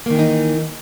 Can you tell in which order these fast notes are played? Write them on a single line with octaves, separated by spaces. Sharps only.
A#3 D#3 E3 D#4